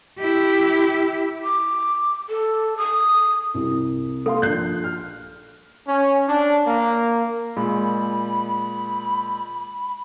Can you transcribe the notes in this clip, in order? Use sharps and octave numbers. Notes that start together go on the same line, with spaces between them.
E4 G4
D6
A4
D#6
C2
A#3 A4 F5 C6
A#1 D4 F#6 G6 C7
F6
C#4
D4
A#3
A#2 G#3 B5